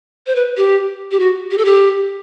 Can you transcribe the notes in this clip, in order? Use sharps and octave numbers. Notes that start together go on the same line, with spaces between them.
C5
B4
G4
G4
F#4
G4
A4
G4